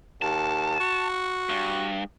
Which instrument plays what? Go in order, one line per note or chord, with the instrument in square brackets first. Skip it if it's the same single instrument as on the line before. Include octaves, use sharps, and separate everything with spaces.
[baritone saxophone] D#2 [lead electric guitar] A5
[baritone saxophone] F#4
[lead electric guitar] G2